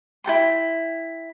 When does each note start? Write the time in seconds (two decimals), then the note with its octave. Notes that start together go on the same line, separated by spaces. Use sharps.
0.24 E4 A4 G5 C6